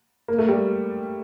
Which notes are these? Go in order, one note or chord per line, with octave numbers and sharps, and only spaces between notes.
A#3
A3
G3